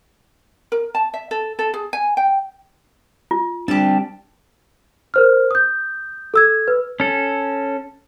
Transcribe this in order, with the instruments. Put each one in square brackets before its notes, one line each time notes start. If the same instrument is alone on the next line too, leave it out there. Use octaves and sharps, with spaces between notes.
[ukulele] A#4
A5
E5
A4
A4
G#4
G#5
G5
[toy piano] F4
[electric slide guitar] G3 C4 [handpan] D4 [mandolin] G4 A5
[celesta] A#4 C5 F6
D#6 G6
A4 E6 G#6
B4
[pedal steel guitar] C#4 A4